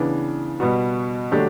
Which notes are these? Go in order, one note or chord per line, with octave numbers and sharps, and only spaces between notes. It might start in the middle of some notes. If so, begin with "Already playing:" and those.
Already playing: C#3 E3 B3 D4
B2 G3 B3 F#4
D3 F#3 A3 D4 G4